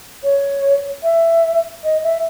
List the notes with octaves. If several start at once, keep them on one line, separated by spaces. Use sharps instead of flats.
C#5
E5
D#5
E5